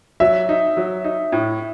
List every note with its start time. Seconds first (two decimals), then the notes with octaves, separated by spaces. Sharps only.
0.20 F#3 E5
0.49 D#4
0.77 F#3
1.04 D#4
1.32 A2